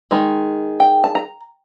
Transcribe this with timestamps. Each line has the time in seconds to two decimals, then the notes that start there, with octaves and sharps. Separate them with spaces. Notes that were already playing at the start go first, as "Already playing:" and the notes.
0.11 D#3 G#3
0.80 G5
1.04 A5
1.15 A#5